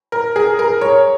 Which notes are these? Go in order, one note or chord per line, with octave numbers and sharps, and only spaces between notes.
A#4
G#4
A#4
C#5